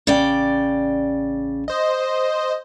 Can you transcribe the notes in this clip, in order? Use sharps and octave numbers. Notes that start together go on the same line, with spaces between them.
A1 C#3 D5 G5
C5 D#5